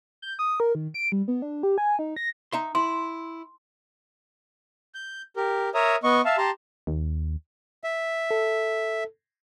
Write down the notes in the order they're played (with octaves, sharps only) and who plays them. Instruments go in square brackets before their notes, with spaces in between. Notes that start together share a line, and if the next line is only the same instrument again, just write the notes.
[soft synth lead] G6
D#6
A#4
D#3
D7
G3
B3
D4
G4
G#5
D#4
A#6
[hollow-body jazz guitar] D#4 E5 C6
[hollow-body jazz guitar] E4 [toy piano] C6
[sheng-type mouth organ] G6
G4 A#4
A#4 C#5 E5 A#5 D#6
B3 D#5 C#6
E5 F5 A5
G4 A5 A#5 C6
[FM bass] D#2
[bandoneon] E5
[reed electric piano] A4